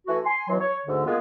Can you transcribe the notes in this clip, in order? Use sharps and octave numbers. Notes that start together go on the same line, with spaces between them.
E3 A3 F#4
G#5 C6
B2 E3 F#3
C#5
D2 G#2 D3
G#3 A#3 B3 F4 G#4